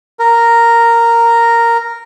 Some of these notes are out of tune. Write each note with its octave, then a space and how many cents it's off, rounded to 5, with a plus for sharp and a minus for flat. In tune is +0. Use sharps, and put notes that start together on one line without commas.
A#4 -5